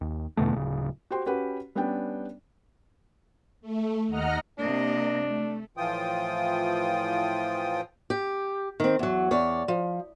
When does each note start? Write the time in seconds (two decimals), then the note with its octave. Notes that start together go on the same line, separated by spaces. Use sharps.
0.01 D#2
0.37 E2 B2 D3 A3
0.54 D1 C#3
1.10 F#4 G4 C5 G5 C6
1.26 C#4 F#4 G4 B4 F#5 B5
1.75 G3 B3 C#4 D4 G5
3.61 A3
4.07 D#2 D#5 F#5 A#5 F6
4.59 C3 A#3 D4 D#5
5.27 A3
5.77 A2 E3 F3 F4 G5 D#6
8.10 G4
8.80 D#3 C4
8.99 E2 F#3
9.31 E2 C#5 D5
9.68 F3